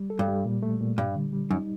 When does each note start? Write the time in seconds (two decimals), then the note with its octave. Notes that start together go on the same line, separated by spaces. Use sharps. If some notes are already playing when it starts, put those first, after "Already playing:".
Already playing: G3
0.10 A4
0.19 G2
0.28 G3
0.45 A#2
0.63 A3
0.80 A#2
0.98 G2 G3
1.16 D3
1.33 G3
1.50 F#2 D#4